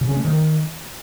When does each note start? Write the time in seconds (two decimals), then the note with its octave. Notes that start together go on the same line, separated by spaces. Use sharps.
0.01 C#3
0.09 C#4
0.17 A3
0.25 D#3